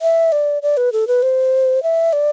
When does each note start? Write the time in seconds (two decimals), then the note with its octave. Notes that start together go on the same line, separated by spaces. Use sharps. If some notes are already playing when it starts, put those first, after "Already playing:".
0.02 E5
0.32 D5
0.62 D5
0.77 B4
0.93 A4
1.08 B4
1.23 C5
1.83 E5
2.13 D5